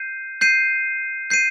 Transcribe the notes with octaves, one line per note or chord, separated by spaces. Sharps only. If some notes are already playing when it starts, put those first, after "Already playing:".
Already playing: G6 C7 D#7
G6 C7 D#7
G6 C7 D#7